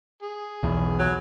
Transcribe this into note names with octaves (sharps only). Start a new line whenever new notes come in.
G#4
B1 E2
F#3